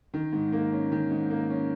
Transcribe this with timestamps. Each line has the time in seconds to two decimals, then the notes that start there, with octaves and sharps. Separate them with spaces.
0.14 D#3
0.33 G#2
0.53 A#3
0.72 C#4
0.92 D#3
1.10 G#2
1.30 A#3
1.50 C#4